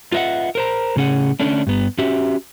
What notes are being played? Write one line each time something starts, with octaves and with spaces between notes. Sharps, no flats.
F4 B4 D#5 E5 F#5
A#4 C5 A#5
A2 C#3 C#4 G#4 F#5
D3 A3 C#4 D4
G2 B3
C#4 F#4 G4 E5